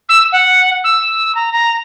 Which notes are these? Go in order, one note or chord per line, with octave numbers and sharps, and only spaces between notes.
E6
F#5
E6
A#5
A#5